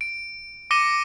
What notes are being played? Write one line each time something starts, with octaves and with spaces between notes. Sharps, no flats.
D7
D6 A#6 C#7 D#7 G7